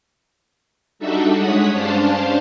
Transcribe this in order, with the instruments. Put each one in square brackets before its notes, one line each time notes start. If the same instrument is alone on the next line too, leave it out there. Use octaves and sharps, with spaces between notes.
[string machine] G3 D4 D#4 F#4 A4 E5
G#3 C#5 F#5 D#6 B6
G2 C#4 D4 C5 F5 A5